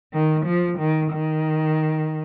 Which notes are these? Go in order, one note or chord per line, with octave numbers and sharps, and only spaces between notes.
D#3
F3
D#3
D#3